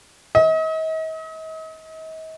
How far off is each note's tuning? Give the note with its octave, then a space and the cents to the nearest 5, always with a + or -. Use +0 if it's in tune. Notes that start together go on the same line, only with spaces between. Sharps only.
D#5 +40